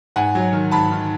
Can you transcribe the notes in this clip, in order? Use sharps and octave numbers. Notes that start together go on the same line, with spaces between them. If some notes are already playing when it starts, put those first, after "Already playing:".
G#2 F#5 G#5
F#3
D#3
G#2 A5 B5
D#3